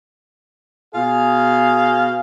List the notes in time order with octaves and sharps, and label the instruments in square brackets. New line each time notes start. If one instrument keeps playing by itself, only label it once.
[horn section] B2 G#4 F5